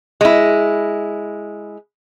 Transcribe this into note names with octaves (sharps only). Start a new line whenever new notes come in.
G#3 E4